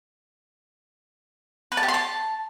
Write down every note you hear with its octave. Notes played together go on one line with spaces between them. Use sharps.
B4
A5
G4
C6
A5